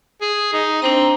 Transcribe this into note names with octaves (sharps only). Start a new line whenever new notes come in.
G#4
D#4
C4 D4 C5 A#5